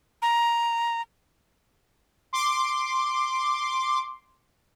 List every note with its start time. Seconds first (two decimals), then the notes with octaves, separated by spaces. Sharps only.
0.22 A#5
2.33 C6 D6